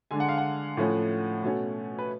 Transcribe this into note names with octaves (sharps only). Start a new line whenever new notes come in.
D3 G#3 D4 G#5
F#5
F5
F#5
A2 F3 A3 C#4
B2 A3 C#4
B4